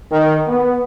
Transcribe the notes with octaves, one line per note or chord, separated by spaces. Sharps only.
D#3
B3